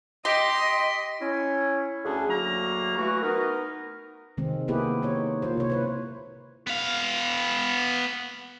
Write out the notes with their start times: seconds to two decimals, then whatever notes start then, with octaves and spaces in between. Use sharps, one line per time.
0.25 G4 D#5 C6 A#6 B6 D7
1.20 C#4 E4
2.04 D2 C#4 D4 G#4
2.28 D2 F#3 A#3 F#4 A#5
2.96 E3 A3 F#4
3.22 B3 D#4 A#4
4.37 C3 D#3 G#3 C4
4.68 A#3 B3 E4 G4 G#4 B4
5.02 D#4 C5 C#5
5.42 A#3 F4 C5
5.57 C3 C#5
5.70 E4 B4 C5
6.67 B3 F5